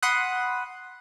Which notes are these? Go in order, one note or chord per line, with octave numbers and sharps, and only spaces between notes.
F#5 B5 C6 D#6 F#6